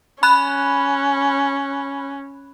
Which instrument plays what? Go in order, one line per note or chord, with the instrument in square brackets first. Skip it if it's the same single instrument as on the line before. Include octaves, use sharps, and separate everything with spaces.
[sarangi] C#4 [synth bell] B5 F#6